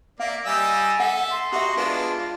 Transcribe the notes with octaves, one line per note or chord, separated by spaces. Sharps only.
A#3 A#4 D5 E5 F5
G3 D#5 G#5 E6
A4 E5 F#5
C6
F#4 G4 D#5 E5 A#5
G#3 B3 D4 F4 B4